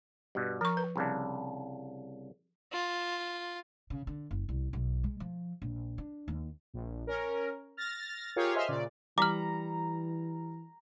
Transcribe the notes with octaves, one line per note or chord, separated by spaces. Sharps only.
G2 B2
F3 A#4 C#6
B4
C2 C#3 D4
F4
C#3
D3
F#1
C2
B1
G#3
F3
A#1
D4
D#2
A#1
C#4 A#4
F6 A6 A#6
F4 G4 G#4 A#4 C#5 F5
C5 D#5 E5 G#5 C6 F6
A#2 C#3 D5
E3 G3 A#5 D6 F6 B6 F#7